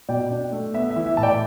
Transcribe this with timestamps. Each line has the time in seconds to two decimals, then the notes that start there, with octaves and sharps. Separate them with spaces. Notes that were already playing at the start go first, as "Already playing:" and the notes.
0.09 B2 D5 G5
0.31 D4
0.52 A3
0.74 B3 E5
0.90 E5
0.96 E3
1.06 E5
1.17 A2 A5
1.23 D5 G5